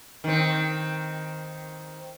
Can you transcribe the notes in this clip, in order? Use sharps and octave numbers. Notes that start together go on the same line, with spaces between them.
D#3 C4